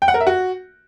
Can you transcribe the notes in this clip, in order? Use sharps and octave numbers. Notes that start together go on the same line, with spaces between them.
G5
F#5
A#4
E5
F#4